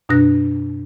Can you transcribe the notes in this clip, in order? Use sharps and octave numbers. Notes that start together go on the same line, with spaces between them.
F#2 B2 D4 F#6 A#6